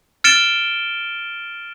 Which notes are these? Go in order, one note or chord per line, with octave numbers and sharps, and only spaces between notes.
F6 A6 C#7 D7 E7 G7